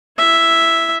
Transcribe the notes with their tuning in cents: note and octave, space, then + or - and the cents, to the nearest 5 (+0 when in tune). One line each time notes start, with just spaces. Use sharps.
E4 +15 E5 +0